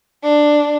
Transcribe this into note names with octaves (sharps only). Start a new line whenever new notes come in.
D4